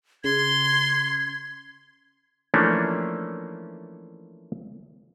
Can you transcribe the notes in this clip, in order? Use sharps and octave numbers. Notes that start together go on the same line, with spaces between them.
C#3 C6 G#6
E3 F3 A3 A#3 C#4 D4